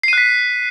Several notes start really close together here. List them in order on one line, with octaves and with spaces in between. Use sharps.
C7 D#7 F#6 B6